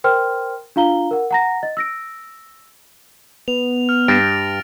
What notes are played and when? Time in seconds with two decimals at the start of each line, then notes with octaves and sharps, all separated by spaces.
0.04 A#4 C5 G5 C6 F6
0.76 D4 F4 F5 A#5 G7
1.11 A#4 F#5
1.31 F#5 A#5 A#6
1.63 D#5 A6
1.77 E6 A#6 D7
3.48 B3 F7
3.89 F6
4.08 G2 A6 A#6 D7